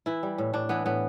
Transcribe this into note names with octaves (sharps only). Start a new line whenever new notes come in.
E3 E4
G3
A2
A2 D4
E3 B3
A2 B3